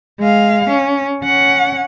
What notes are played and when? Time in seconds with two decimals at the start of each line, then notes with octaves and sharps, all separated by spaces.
0.20 G#3 F5
0.69 C#4
1.23 C#4 F#5